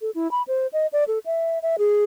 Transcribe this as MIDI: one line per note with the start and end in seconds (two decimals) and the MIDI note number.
0.01 0.10 69
0.15 0.30 64
0.31 0.42 83
0.48 0.67 72
0.73 0.87 75
0.93 1.04 74
1.08 1.19 69
1.26 1.59 76
1.62 1.76 76
1.79 2.04 68